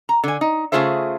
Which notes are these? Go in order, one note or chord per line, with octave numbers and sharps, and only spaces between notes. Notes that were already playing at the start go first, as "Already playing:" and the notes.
A#5
D3 G#5
D#4
C#3 A3 F4 G#4 C5 E5